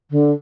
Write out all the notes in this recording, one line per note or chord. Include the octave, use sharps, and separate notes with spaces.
D3